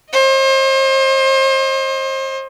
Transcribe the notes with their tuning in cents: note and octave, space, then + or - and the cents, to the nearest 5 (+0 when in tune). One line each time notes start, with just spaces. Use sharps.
C5 +35 D#5 +0